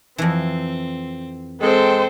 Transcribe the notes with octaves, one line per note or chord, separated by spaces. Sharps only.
F2 E3 C4
G#3 C4 A4 C5 G5